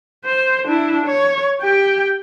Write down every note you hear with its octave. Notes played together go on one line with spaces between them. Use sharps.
C5
D4 E4
C#5
G4 G5